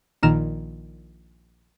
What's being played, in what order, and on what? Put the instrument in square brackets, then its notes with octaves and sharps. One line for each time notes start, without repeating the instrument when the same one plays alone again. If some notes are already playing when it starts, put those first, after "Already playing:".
[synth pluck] A#1 A#2 D#3 A#5 F6 E7